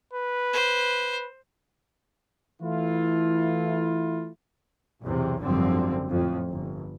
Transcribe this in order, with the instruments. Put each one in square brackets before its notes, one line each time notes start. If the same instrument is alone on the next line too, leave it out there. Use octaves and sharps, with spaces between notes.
[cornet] B4
[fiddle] C5
[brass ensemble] E3 A3 E4 F4
[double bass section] B1 E2 C3
G#1 F#2 D3 F3 G3 C4
F2 A2
G1